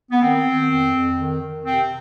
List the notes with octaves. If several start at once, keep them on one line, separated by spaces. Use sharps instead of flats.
B3
D#3 C4
D#3
F2
F2
D#3
D#3
C3 C4